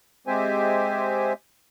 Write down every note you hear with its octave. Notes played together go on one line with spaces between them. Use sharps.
G#3 C4 G4 C5 E5 G#5